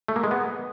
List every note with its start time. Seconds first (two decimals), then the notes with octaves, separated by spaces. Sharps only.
0.08 A3
0.16 A#3
0.24 G#3
0.31 B3